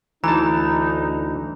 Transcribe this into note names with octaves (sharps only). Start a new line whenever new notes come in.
D2 E3 D#4 A5 A#5